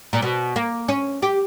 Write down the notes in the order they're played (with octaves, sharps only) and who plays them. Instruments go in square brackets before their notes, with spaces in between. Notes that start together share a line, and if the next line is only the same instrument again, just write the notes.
[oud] A#2
B2
A#3
C#4
G4